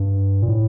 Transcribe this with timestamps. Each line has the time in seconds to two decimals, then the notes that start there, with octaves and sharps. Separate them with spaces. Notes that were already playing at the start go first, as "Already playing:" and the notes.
Already playing: G2
0.42 A#2
0.49 A2